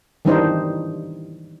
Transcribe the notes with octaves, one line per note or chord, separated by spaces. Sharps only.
D#3 E3 G3 D4 D#4 C5